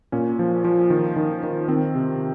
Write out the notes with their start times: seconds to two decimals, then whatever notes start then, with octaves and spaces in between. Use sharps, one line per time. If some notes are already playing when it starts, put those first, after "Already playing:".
0.12 A#2 C#4
0.39 F3
0.64 F3
0.90 D#3
1.16 D#3
1.43 D#3
1.68 D#3 C4
1.95 C3